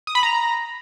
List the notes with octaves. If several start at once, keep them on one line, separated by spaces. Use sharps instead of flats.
D#6
B5
A#5